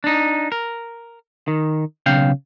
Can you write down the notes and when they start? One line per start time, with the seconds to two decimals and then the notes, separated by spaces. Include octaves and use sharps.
0.04 D4 D#4
0.52 A#4
1.48 D#3
2.06 B1 C#3 F5 G5